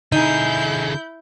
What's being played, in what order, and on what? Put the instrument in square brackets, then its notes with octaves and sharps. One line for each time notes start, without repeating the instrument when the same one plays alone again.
[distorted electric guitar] D3 G#4 [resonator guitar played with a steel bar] D#4 [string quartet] E4 G6